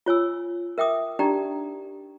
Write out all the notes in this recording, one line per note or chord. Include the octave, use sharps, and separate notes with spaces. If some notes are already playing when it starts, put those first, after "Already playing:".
F4 C#5 G#5 E6
A#4 E5 G5 D6 D#6
D4 D#4 G4 D5 G5 A#5